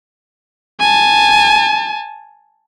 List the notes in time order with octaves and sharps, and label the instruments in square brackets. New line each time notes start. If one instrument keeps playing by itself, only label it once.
[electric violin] G#5 A5